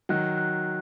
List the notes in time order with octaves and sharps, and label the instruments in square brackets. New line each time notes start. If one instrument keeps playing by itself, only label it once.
[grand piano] D#3 F#3 [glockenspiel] F#6
[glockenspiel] F#6